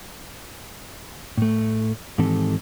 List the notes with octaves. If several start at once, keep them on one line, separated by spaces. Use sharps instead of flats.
A2 A3
G#2 D#3 E3 C4 G4 A4